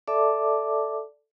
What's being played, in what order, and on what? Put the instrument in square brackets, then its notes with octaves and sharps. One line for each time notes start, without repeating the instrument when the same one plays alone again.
[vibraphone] A4 D5 E5 A5 D6